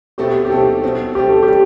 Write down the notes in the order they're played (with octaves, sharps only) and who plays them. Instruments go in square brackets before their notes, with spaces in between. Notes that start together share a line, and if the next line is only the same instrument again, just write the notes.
[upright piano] B2 A3 C4 [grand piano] G4
[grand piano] G4
[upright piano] B2 A3 C4 [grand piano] A4
[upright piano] B2 A3 C4
[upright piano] B2 A3 C4 [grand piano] G4
[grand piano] A4
G4
[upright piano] G3